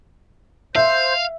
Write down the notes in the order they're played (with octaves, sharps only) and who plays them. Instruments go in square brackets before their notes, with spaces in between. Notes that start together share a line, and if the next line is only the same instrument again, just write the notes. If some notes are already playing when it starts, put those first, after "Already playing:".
[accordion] C5 [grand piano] E5 [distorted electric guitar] F5